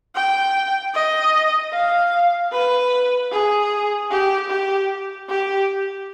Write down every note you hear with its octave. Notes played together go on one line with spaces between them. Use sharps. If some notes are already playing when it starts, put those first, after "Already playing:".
G5
D#5
F5
B4
G#4
G4
G4
G4